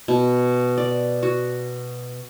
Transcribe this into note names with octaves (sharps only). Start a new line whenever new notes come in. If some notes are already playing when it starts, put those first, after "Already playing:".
B2
D5
F#4